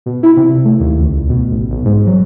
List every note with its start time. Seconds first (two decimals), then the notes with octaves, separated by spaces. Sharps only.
0.06 B2
0.23 E4
0.37 C3
0.65 A3
0.80 D#2
0.98 C#2
1.29 B2
1.51 A1
1.71 B1
1.85 G#2
2.07 F#3